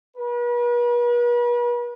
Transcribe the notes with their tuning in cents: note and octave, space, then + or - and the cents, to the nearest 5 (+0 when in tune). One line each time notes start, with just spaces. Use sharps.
B4 -40